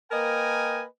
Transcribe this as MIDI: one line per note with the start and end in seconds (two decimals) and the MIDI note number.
0.12 0.83 58
0.12 0.83 70
0.12 0.83 71
0.12 0.83 75
0.12 0.83 79
0.12 0.83 80